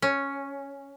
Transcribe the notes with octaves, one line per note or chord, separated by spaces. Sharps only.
C#4